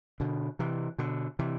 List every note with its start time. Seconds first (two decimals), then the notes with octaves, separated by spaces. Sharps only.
0.20 B2 D3
0.59 C3 E3
0.98 B2 D3
1.39 C3 E3